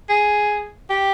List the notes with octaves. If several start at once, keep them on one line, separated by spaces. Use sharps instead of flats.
G#4
G4